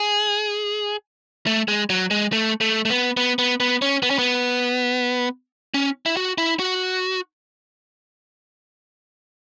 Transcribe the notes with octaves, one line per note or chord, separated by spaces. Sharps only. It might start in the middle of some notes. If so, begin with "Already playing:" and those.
Already playing: G#4
A3
G#3
F#3
G#3
A3
A3
A3
B3
B3
B3
B3
C#4
B3
C#4
B3
C#4
E4
F#4
E4
F#4